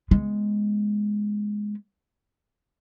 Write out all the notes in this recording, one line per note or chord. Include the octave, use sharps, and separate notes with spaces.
G#3 B3